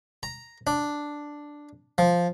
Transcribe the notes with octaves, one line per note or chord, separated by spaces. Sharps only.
A#5
D4
F3